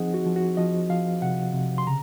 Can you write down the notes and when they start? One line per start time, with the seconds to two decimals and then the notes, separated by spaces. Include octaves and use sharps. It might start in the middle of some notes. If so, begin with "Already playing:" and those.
Already playing: F3 C4 D#4 G#4 D#5 F#5
0.14 F#4
0.26 F3
0.36 F#4
0.57 F3 D#5
0.89 F3 F5
1.22 C3 F#5
1.54 C3
1.78 C6
1.87 C#3 A#5